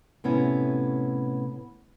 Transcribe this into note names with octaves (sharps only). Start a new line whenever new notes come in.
A2 C3 B3 C#4 E4